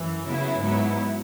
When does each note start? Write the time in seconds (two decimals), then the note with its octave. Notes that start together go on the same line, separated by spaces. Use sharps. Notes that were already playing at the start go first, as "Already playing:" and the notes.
Already playing: F#2 E3
0.26 C#3 F#3 B3 E4
0.62 G#2 F#3 B3 E4